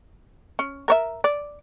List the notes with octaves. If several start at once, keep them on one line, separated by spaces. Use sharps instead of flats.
C#4
A#4 C#5 E5
D5